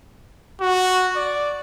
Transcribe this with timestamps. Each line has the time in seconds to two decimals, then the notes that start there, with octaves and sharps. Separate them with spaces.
0.61 F#4
1.16 D5